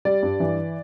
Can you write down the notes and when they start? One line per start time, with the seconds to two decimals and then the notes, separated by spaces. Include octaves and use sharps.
0.05 G3 D5
0.23 G2
0.40 E3